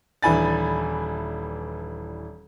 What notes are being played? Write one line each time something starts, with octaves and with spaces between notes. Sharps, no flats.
D#1 E3 D4 G#5 B5 A6